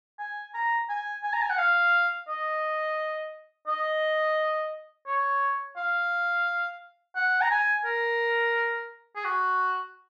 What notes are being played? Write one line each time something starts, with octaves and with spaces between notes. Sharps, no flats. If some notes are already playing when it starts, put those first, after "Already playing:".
G#5
A#5
G#5
G#5
A#5
G#5
F#5
F5
D#5
D#5
C#5
F5
F#5
A#5
G#5
A#4
G#4
F#4